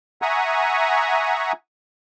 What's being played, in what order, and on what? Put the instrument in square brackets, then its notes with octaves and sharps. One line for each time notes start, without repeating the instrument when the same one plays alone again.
[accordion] E5 F#5 G#5 A#5 C#6 D#6